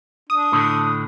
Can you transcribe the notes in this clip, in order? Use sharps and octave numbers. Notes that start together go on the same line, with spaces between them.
D4 D#6
A2 D3